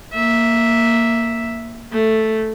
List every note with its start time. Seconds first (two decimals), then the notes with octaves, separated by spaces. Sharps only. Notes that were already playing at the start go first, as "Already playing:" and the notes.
0.14 A#3 E5
1.92 A3